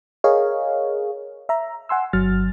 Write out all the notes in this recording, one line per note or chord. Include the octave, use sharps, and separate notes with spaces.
G#4 A#4 C#5 D#5 F5
E5 A#5
F#5 G#5 C6 E6
G1 F#3 F6 A6